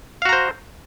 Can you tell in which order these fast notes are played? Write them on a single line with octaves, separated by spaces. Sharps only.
F5 F#4 A#5 C5